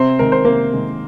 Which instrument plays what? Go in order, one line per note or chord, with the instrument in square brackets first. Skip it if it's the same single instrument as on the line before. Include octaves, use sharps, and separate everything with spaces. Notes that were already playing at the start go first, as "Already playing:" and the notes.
Already playing: [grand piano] C3 C4 C5
D#3 G#3 A#4
C5
C3 A#3 A#4
D#3 G#3